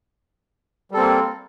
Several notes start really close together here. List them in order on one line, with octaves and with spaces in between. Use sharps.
G3 A4 C4 A#3